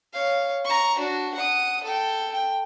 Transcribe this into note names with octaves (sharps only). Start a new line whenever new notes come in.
C#5 F5
A#5 C#6
D4 F#4
F#5 D#6
A4 G5
G5